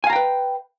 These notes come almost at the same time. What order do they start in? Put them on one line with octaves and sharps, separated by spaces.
G#5 F5 A#5 G5 B4